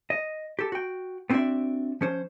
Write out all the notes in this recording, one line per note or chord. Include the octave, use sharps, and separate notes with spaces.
D#5
G4 A4
F#4 G5
B3 C4 D4 F#4 D5 E5
F3 C#4 C5